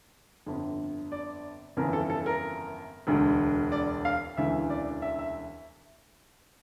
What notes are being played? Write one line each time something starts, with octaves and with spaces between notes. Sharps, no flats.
G1 F2 D3
D5
G1 F2 C#3 E3 A#4
A4
A4
A#4
E1 D2 D3
D5
F5
E1 D2 C#3 E3 E5
D5
E5
E5